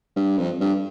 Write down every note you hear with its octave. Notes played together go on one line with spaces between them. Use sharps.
G2
F2
G2